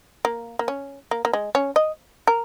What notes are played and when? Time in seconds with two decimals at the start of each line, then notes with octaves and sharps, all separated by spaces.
0.25 A#3
0.59 A#3
0.68 C#4
1.11 A#3
1.25 A#3
1.33 G#3
1.55 C#4
1.76 D#5
2.27 A#4